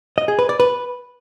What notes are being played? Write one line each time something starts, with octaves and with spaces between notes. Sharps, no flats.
D#5
G#4
B4
D5
B4